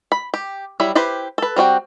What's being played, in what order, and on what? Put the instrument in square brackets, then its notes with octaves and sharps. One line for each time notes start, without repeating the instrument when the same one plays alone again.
[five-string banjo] B5
G4
F#3 G3 E4 B5
E4 G4 B4 C5
A4 B4
G3 C4 F#4 G5